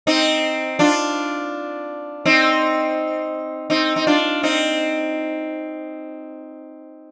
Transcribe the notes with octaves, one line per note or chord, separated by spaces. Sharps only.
C4 D#4
D4 F4
C4 D#4
C4 D#4
D#4
D4 F4
C4 D#4